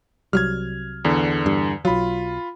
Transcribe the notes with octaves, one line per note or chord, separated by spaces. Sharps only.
C2 F#3 G3 F6 G#6
E2 D3
G2
B1 F#3 F4 B5